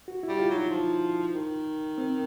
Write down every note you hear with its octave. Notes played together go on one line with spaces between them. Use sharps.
F#4
E4
G3
F4
F#3 D#4
F3
D#3
C4